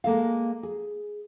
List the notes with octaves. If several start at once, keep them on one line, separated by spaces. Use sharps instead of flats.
G#3 A#3 A4 F5
G#4